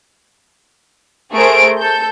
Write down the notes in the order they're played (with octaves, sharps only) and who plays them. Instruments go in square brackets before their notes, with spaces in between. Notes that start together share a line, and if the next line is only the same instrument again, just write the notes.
[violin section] A3 G#4 A#4 C5 D7
A4 G6